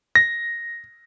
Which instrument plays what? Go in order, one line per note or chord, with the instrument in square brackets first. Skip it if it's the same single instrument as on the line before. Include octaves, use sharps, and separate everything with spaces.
[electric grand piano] A#6